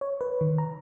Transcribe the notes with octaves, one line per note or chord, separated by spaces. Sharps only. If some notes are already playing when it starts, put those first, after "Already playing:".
C#5
B4
D#3
A#5